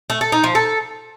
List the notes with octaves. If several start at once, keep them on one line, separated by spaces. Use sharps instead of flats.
A3
A4
D#4
F3
A4